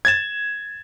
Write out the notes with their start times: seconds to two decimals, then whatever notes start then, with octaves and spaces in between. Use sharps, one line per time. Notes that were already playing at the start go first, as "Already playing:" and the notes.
0.05 G#6 A6 E7